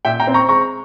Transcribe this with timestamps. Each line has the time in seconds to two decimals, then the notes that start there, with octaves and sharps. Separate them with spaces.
0.05 A#2 E5 G5
0.20 G5 A#5
0.27 C4
0.34 A#5 C#6
0.49 G#3 A#5 C#6